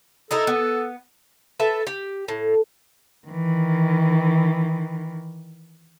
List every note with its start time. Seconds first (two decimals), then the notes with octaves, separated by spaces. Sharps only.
0.31 D#4 E4 A4 A#4
0.47 B3
1.60 A4 B4 E5
1.87 G4
2.28 A2
3.27 D#3 E3